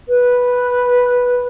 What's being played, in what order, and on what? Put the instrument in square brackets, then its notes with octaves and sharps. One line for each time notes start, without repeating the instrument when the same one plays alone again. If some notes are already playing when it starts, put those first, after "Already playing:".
[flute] B4